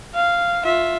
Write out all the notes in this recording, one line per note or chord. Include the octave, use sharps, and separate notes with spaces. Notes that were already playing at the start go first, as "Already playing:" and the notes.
F5
F4 E5